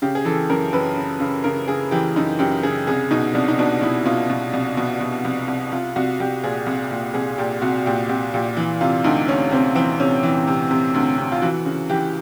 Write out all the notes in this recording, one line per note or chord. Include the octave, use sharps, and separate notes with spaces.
C#3 G4
G#4
E3 A4
F#2 A#4
F#2 B4
C#3
C#3
C#3 A#4
C#3 G#4
E3 G4
F#2 D#4
F#2 G4
C#3 G#4
C2 G#4
B2 D#4
C2 D4
D#4
B2 D4
B2 E4
B2 F4
B2
C2
B2
B2
C2
C2
C2 F4
C2 F#4
C2 G4
A#2 G#4
C2
A#2
C2 G#4
A#2 G4
C2 F#4
A#2 G4
C2 G4
A#2 G4
E3
C3 F4
D2 D#4
D2 C#4
C3 C4
E3 C4
C3 C#4
E3
C3
C3
D2
C3
F4
E3 F#4
C#3
E3 G4